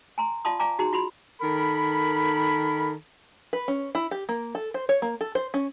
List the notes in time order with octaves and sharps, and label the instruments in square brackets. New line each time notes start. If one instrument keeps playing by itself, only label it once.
[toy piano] G#5 A#5 C6
F4 D5 F5 A5 C6 D#6
D5 F5 G#5 A#5 D6
D#4 F#4 G#4 A#5 C6
F4 F#4 B5 C6
[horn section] D#3 A4 A#4 B5
[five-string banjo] B4
C#4
E4
G4
A#3
A4
C5
C#5
A#3
A4
C5
C#4